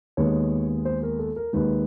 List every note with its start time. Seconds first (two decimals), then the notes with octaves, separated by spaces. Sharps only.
0.17 D#2 D#3 G#3 B3 C#5
0.85 C5
1.03 A#4
1.19 A4
1.36 A#4
1.53 D#2 D#3 G#3 B4